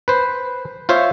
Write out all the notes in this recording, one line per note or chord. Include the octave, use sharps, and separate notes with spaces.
B4 C5
F4 C5 C#5 E5